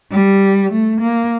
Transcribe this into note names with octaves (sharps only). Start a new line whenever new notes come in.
G3
A3
A#3